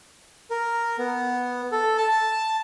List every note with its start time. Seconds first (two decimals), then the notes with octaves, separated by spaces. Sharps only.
0.50 A#4
0.98 B3
1.72 A4
1.98 A5